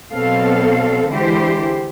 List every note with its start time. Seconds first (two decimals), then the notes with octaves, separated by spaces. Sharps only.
0.13 B2 F#3 B3 C4 A4 F5
1.08 D3 E3 G#3 E4 G4 C5